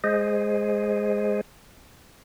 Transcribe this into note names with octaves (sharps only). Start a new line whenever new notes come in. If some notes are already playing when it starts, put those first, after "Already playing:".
G#3 G#4 C5 D#5